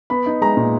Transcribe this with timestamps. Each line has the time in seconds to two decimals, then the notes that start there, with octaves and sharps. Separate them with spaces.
0.10 B3 B5
0.26 D#4
0.41 G#3 A#5
0.57 A#2